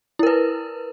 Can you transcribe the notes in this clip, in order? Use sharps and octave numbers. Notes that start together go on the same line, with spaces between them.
E4 A#4 B4